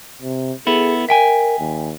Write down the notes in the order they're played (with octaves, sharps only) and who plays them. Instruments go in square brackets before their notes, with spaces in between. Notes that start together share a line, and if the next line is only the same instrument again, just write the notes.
[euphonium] C3
[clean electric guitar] B3 E4 A4 [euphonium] G#4
[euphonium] A#4 [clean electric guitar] E5 G5 G#5
[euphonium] D#2